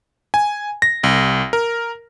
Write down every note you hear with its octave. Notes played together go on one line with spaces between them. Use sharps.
G#5
A#6
C2
A#4